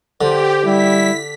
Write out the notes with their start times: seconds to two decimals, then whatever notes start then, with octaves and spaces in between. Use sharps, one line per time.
0.21 D3 G4 C5
0.64 G3 E4 B6